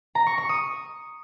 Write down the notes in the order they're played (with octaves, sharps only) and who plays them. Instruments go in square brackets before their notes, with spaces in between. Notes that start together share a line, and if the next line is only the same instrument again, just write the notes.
[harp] A#5
C#6
C#6
D#6